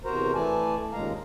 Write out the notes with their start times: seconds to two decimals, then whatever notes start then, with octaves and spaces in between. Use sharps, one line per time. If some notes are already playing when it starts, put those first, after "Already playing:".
0.05 E2 C3 F#4 A#4 C5 A#5
0.34 E3 A3 D5 G#5 A5
0.92 D#2 A#2 C#3 G#3 F5 A#5